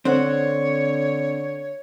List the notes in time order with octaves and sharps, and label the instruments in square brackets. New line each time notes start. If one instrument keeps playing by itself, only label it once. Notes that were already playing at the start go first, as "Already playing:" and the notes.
[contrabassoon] D3 [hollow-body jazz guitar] C4 C5 F#5 [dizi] C#5